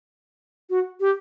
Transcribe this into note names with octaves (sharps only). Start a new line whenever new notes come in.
F#4
G4